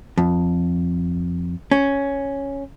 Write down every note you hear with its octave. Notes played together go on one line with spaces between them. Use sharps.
F2
C#4